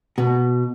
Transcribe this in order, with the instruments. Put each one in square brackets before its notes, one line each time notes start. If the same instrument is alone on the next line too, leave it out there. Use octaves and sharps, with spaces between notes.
[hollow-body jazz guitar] B2